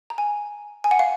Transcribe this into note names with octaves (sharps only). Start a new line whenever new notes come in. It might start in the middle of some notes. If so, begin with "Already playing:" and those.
A#5
G#5
G#5
F#5
F5